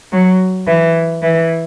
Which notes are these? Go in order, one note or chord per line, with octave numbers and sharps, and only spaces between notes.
F#3
E3
E3